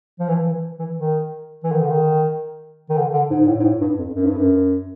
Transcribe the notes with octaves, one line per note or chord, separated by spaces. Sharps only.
F3
E3
E3
E3
D#3
E3
D#3
D3
D#3
D#3
D3
D3
G#2
G#2
A2
G#2
A2
G2
F2
F#2
G2
F#2